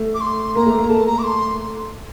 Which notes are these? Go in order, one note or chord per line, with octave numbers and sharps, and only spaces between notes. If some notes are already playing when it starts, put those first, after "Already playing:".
Already playing: A3
D6
C6
A#3 A#5
A3
A#3
A3 A5
A#5
D6
C6